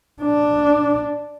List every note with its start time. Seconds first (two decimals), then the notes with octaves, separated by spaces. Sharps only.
0.23 D4